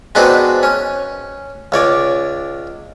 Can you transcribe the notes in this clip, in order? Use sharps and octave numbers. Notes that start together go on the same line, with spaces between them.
G#3 B3 C4 D4 D#4 F#4
C#4
C#2 C#5 D5